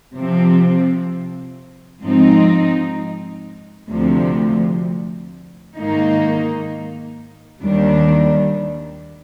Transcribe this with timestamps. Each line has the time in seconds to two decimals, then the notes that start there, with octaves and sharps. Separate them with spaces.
0.15 C3 F3 C4
2.02 G#2 F3 C4 D#4
3.89 D2 C3 F3
5.76 G#2 D#3 A#3 D#4
7.63 D#2 D#3 G3 D4